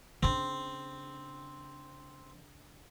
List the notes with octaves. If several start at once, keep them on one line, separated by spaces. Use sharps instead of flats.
C#3 C4 D4